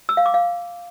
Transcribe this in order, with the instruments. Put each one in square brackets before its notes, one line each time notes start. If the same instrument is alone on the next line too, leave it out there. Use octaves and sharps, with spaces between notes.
[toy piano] E6
F5
D6
F5